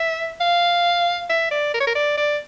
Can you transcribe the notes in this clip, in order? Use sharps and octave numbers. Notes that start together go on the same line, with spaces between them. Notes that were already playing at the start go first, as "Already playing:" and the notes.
Already playing: E5
F5
E5
D5
A#4
C#5
A#4
D5
D5